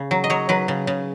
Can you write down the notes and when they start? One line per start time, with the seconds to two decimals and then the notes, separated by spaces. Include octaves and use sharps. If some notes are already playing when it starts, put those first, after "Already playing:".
Already playing: C#3
0.11 F#3
0.24 D#5
0.30 F#3 C#5
0.49 F#3 B4
0.68 C#3
0.87 C#3